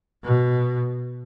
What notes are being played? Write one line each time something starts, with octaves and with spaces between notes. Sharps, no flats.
B2